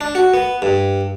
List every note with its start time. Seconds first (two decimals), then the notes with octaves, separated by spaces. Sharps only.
0.01 D4
0.15 F#4
0.34 B3
0.62 G2